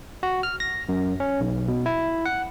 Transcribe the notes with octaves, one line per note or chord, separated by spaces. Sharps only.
F#4
F6
A#6
F#2
C#4
B1
B2
E4
F#5